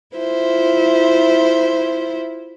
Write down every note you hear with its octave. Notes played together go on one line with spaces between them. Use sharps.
E4 F4 C5 E5